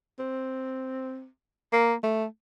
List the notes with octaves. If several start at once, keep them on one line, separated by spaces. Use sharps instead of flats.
C4
A#3
A3